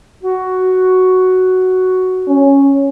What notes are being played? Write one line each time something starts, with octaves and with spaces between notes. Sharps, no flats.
F#4
C#4